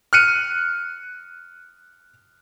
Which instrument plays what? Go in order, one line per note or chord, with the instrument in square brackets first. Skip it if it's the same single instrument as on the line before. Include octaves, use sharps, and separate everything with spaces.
[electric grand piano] F6 F#6 C#7 D#7